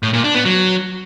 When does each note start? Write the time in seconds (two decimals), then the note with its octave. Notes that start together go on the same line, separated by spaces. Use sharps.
0.03 A2
0.13 A#2
0.24 D4
0.35 B3
0.45 F#3